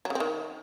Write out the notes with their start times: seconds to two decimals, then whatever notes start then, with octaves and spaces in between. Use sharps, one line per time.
0.05 F#3
0.10 C#3
0.15 C4
0.20 D#3